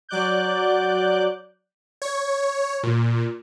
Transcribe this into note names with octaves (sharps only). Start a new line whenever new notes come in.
F#3 D5 D6 F#6 G6
C#5
A#2